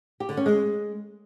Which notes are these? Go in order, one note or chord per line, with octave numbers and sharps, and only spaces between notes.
G4
D3
C#4
G#3